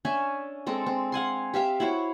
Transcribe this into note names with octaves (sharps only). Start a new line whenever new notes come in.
C#4 D4 E5 G#5
G#3 C4 A4
C4
F5 F#5 G#5 C6
G4 E5 F5 G5
E4 F#4 C5 C#5